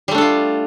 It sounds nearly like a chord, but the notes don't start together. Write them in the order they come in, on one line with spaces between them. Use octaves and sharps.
G3 A3 D4 A4 F4